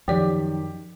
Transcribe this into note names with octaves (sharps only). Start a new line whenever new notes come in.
F#2 D#3 F3 G4 D5